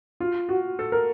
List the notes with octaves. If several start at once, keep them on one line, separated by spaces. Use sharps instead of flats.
F4
F#4
A4
A#4